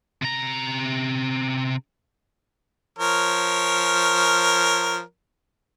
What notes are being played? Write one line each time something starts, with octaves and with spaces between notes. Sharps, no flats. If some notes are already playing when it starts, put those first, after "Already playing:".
C3 A#5
F3 A#4 C#5